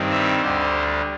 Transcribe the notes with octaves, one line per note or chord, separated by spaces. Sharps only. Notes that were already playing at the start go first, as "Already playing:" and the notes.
Already playing: G2 D#3 G3 C4
E5
D2 D3 G3 C5